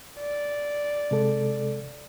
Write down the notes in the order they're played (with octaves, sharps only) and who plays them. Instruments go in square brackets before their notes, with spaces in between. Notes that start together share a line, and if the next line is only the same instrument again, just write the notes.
[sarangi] D5
[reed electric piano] C3 G#3 A4